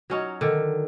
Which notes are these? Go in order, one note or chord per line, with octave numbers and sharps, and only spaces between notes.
F#3 C#4 D#4
D3 D#3